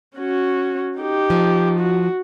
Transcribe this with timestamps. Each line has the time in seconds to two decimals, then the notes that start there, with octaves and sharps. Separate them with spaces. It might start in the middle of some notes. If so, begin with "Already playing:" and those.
0.16 C#4 F#4
0.97 D#4 G4
1.30 F3
1.80 F#4